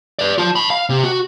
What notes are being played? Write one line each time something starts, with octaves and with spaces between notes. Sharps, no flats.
B4 D5
F4 A5
A5 B5
F5
C3
F#4